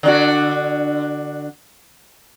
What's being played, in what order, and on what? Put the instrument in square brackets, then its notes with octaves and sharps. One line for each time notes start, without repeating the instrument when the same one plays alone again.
[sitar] D3 D4 F#4